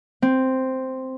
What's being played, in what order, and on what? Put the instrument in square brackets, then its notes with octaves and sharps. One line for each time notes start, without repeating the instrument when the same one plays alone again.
[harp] C4